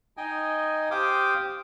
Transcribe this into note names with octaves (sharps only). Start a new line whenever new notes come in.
D#4 D#5 G5 G#5
G4 C5 F5 G5 D6 D#6